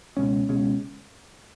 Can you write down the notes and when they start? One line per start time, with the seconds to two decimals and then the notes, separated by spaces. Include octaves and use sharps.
0.17 C#2 B2 G#3 C#4
0.49 C#2 B2 G#3 C#4